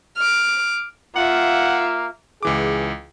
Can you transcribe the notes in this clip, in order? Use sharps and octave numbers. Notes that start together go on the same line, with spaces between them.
D6 F6
A#3 F4 E5 F#5
C#2 E3 G#4 D6